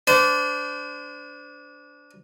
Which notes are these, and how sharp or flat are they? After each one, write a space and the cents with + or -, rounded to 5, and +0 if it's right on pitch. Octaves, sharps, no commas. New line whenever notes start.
D4 -20 C5 -35